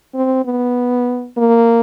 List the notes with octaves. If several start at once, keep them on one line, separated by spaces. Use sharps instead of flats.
C4
B3
A#3